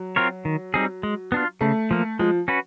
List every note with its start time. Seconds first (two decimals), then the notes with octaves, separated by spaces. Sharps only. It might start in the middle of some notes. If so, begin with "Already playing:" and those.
Already playing: F#3
0.16 C4 F4 A#4 C#5
0.45 D#3
0.74 G3 C4 D#4 G#4
1.03 G#3
1.32 B3 D4 F4
1.61 C#3 A3
1.91 F3 A#3
2.19 F3 G#3
2.48 C#4 F#4 B4